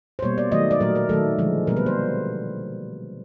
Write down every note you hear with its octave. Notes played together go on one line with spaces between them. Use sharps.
C5
B2 G3 A#3 C#5
D5
D#3 F#3 A3 D#5
D5
A#2 F#3 A3 A#4
A#4
D#3 F#3 A3 A4
D3 F3 G#3
B2 G3 A#3 A#4
B4
C5